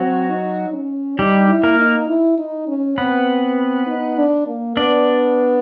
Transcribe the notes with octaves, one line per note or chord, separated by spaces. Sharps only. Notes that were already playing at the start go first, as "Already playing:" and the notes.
Already playing: F#3 C4 F#4
D#4
C#4
G3 D#4 G4
E4
A#3 A#4
D#4
E4
D#4
C#4
B3 C4 B4
D#4
D4
A#3
B3 D4 D5